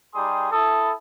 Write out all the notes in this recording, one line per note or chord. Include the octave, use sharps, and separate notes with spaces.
G3 D#4 G4 G#4 C6 D#6
E4 A4 D#6